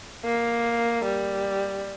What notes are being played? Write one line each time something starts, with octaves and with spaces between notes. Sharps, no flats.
A#3
G3